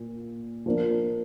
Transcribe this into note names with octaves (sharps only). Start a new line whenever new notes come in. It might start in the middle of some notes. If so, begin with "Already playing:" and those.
Already playing: A#2
F3 A#3 D4